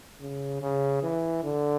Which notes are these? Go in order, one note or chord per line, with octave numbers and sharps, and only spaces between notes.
C#3
C#3
E3
D3